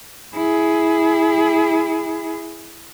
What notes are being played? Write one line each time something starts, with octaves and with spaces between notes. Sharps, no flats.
E4 G#4